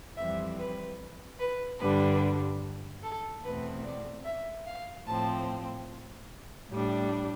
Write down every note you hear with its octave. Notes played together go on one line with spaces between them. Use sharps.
F2 E3 G3 C4 E5
B4
B4
G2 D3 G3 D4 B4
A4
E2 B2 A3 C4 B4
D5
E5
F5
A2 F3 C4 A5
A2 G3 D4